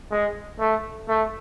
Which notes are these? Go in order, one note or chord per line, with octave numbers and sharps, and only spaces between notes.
G#3
A3
A3